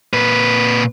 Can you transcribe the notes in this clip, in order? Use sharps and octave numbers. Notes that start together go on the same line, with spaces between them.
A#2 B4